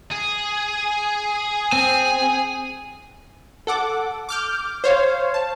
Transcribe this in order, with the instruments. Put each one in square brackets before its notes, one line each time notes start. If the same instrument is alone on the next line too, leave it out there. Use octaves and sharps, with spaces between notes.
[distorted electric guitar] G#4
[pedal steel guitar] C4 [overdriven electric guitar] G#5
[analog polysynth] A4 F#5 D6
D6 F6 G6
C5 C#5 F5
A5